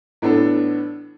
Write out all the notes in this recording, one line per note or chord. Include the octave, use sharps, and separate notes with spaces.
A2 E3 B3 D4 A4